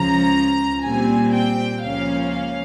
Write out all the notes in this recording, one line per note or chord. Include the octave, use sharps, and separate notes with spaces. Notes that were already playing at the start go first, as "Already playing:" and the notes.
Already playing: C#2 C#3 F3 A#5
A#2 G3 C4 G#5
G5
C#2 C#3 F3 A#3 C#4 F5
F5